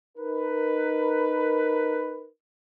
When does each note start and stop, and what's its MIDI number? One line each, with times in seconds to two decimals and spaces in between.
0.18 2.28 63
0.18 2.28 70
0.18 2.28 71